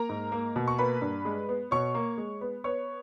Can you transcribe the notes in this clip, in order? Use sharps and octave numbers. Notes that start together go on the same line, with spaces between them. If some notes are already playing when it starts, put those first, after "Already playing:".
Already playing: A#3 A#4 A#5
G#2
A#3
B2
C#6
A#3 B4 B5
G2
G#3
B3
B2 C#5 C#6
A#3
G#3
B3
B3 C#5 C#6